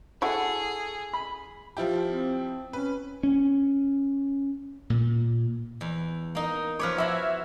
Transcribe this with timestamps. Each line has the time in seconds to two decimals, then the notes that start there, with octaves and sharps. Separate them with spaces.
0.22 E4 F#4 G#4 A4
1.14 B5
1.77 F3 E4 F4 G4
2.10 C4
2.73 C#4 B4
3.23 C#4
4.90 A#2
5.81 E2
6.35 A#3 D#4
6.79 F3 B4 C#5 D6 F6
6.98 E4 F#4 E5